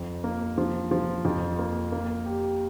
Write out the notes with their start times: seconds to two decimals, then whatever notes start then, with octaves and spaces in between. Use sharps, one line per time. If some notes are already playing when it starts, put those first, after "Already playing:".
Already playing: F2
0.24 A#3
0.58 F3
0.91 F3
1.25 F2
1.59 A#3
1.92 A#3
2.26 G4